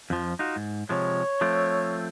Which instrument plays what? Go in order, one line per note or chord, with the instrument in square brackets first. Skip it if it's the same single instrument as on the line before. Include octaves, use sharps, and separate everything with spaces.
[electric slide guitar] F2 F3
D#4 F4 F#4
G#2
[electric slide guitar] C3 F3 G#3 [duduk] C#5
[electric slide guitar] F3 A3 C4